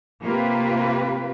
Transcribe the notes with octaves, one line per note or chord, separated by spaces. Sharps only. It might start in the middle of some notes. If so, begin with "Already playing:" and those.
C3 A#3 C4 F4 G4 B4